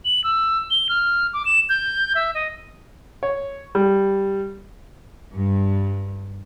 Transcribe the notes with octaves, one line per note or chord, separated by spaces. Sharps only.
F#7
E6
G7
F6
D6
E7
G6
E5
D#5
C#5
G3
G2